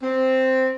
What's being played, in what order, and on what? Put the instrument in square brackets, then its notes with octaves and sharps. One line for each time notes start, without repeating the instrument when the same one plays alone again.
[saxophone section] C4